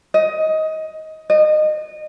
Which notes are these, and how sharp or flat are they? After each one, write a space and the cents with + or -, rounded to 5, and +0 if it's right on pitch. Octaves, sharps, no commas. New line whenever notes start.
D#5 +15
D#5 -25